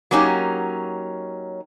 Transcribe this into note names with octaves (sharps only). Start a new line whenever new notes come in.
F#3 A#3 C#4 D#4 G4